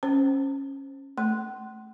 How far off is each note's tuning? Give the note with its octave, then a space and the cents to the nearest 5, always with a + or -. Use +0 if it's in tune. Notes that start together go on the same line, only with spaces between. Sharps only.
C#4 -15 C5 +0
A3 +0 C6 +0